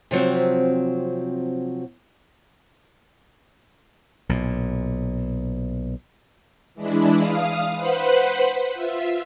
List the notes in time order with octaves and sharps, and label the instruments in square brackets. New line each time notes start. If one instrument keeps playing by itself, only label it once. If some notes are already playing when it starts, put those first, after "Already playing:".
[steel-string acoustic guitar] C3 F3 F#3 C4
[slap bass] B1 A#2
[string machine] E3 G#3 D4 E4
F5 D#6
B4 C5 F#5 B5
F4 E5